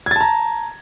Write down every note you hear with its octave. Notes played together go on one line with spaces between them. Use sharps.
A5 A#5 G#6 A6